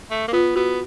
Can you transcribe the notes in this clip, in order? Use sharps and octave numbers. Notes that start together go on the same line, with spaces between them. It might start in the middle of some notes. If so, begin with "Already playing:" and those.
A3
A#3
B3 F4
B3 F#4